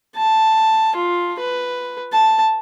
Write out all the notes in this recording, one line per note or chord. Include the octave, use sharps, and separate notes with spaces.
A5
F4
B4
A5